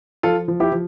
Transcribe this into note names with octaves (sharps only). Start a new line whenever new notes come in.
F3 F4 A4
F3
E4 G4
F3